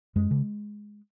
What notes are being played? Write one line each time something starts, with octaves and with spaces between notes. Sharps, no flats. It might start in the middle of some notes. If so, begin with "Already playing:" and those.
F#2 G#3
C#3